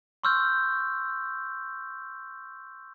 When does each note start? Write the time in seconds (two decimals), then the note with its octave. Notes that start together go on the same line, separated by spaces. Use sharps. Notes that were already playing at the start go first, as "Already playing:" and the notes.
0.24 C6 C#6 E6 F6 G6